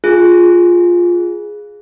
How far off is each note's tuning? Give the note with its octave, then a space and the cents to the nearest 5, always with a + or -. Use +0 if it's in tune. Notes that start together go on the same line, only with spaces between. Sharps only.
F4 +5 G#4 +0